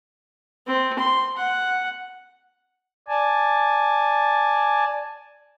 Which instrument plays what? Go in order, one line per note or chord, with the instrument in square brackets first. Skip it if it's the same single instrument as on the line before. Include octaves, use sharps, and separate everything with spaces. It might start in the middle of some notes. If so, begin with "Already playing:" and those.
[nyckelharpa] C4
C6
F#5
[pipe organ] D5 G#5 A5